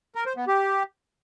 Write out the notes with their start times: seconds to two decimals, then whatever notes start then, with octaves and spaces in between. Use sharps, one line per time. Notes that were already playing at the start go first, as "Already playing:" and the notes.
0.15 A#4
0.26 C5
0.37 B3
0.47 G4